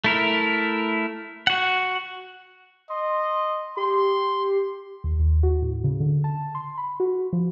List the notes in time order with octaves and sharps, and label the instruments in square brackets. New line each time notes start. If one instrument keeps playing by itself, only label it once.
[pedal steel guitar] A3 E4 A#4
F#4 F#5
[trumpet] D#5 [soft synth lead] C6
[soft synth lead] G4 [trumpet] C6
[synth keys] D#2
D#2
F#4
A2
C#3
D3
A5
C6
B5
F#4
F3